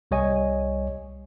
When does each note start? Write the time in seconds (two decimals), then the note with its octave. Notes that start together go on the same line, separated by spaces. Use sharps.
0.11 C2 G3 C#5 D#5 G#5